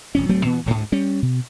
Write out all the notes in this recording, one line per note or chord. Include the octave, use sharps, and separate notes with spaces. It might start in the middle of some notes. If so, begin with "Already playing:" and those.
F1 F2 C#4
D1 F#3 A3 C4
A#2 E3 B3
D1 D2 G#2
G3 C#4
B2